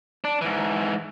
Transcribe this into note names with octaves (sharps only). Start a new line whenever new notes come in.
D4
G#2 E3